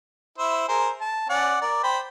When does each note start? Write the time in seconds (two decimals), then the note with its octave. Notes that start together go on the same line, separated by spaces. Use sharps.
0.38 E4 C5 E5
0.68 G#4 A#4 C5
1.01 A5
1.29 C#4 D5 F#5
1.62 A#4 D5
1.83 C5 G5 B5